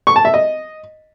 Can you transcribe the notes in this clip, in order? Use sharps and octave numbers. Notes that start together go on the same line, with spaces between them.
C#6
A5
E5
D#5